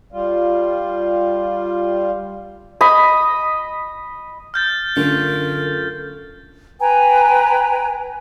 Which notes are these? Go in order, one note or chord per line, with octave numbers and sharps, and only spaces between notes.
G3 F4
D#5 B5
F6 G6 A6
F#2 D3 A3 F4 A#4
B4 G5 G#5 A#5